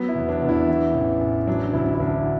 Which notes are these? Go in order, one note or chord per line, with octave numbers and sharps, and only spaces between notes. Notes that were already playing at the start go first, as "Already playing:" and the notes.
Already playing: F#3 B3
E4
E2
D4
E2
E4
E3
A1
A1
F#3 D4
D2 E4
E4
D2 D4